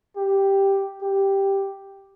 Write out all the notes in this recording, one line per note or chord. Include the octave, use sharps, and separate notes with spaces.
G4
G4